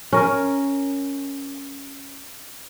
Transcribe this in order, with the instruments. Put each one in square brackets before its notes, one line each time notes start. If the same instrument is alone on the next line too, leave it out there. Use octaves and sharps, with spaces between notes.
[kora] C#4 A#4